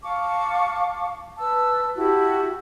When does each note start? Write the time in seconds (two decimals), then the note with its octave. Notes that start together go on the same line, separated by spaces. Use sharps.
0.02 F5 A5 C#6 D6
1.38 B4 A5 E6
1.96 E4 F#4 G4 A5